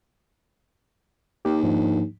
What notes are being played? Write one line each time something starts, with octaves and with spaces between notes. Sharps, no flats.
D#2 G4
G#2 F3 D4